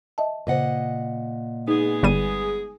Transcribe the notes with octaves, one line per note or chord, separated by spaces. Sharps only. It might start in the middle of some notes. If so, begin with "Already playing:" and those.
D#5 E5 A5
A#2 C#3 C5 D#5 F#5
G#3 B3 D#4 G#4
G1 G3 D#7